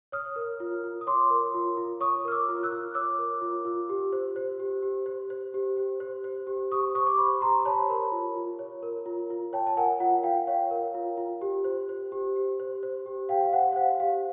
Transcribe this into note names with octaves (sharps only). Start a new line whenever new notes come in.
C#5 D#6 F6
A#4
F4
F4
D#6
C#5 C6 D6
A#4
F4
F4
C#5 C#6 D#6
A#4 F6
D6 E6
F4
E6 F#6
F4
C#5 D6 E6
A#4
F4
F4
G4
C5
C5
G4
G4
C5
C5
G4
G4
C5
C5
G4
G4 C#6 D#6
C5 C#6 D#6
D6
C5 B5 C#6
G4 A#5 C6
C#5 A5 B5
A#4
F4
F4
C#5
A#4
F4
F4
C#5 G5 A5
A5
A#4 F#5 G#5
F4 F#5
F4 F5 G5
C#5 F5 G5
A#4
F4
F4
G4
C5
C5
G4
G4
C5
C5
G4
G4 F5 G5
F5
C5 F#5
F#5
C5 F5
G4 F5